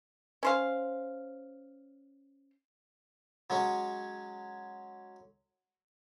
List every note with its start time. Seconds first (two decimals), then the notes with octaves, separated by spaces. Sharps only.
0.43 C#4 C5 F5
3.50 F#3 G#3 C#4